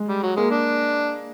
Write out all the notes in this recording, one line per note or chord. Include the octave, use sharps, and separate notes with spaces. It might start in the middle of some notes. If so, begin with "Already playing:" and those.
Already playing: G#3
G3
F#3
G#3 A#3
D4